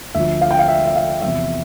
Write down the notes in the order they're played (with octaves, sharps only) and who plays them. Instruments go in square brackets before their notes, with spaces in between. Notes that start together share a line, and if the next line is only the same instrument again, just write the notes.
[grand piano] D2 D3 F3 E5
F5
G5
F5
E5
E5
F5
E2 C3 F3 E5